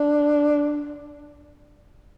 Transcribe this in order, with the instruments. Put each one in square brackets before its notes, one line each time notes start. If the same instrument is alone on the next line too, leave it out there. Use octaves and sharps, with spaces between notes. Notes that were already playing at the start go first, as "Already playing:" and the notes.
Already playing: [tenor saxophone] D4